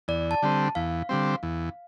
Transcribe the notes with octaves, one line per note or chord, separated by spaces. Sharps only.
E2 D5
A5
D3 G3 C4
E2 F5
D3 G3 C4
E2